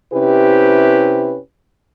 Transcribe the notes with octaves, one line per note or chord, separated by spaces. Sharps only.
C3 C#4 E4 G4 B4